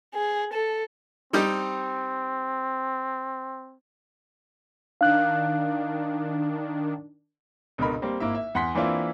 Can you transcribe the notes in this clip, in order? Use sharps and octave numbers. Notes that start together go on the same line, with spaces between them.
G#4
A4
G3 C4 D#4 G4
D#3 D4 F5 F#6
C#2 B2 D3 A#4 B5
G3 A#3 C4
G#1 A#3 E4 E5
E5
E2 F#5 C6 B6
E3 A#3 C4 D4 E4 F4